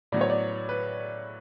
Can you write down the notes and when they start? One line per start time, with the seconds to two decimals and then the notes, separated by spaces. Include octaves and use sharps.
0.12 A2 F#3 B3 D5
0.21 C#5
0.30 D5
0.69 B4